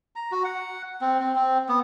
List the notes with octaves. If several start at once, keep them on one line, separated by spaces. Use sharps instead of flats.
A#5
F#4
F#5
C4
C4
C4
B3